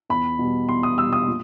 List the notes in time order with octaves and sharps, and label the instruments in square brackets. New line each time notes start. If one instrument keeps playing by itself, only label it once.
[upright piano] E2 B5
B2 G3
E2 C6
D#6
B2 G3 E6
D#6
A#2